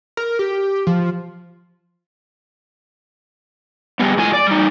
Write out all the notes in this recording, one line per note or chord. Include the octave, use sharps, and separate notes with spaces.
A#4
G4
F3
G3 G#3 B3
A2 G#3 F4 G#5
D5
G3 D#4